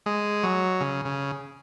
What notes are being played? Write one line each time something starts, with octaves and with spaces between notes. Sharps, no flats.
G#3
F#3
C#3
C#3